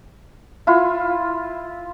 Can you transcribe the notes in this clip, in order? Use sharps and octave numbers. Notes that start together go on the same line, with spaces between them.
E4 F4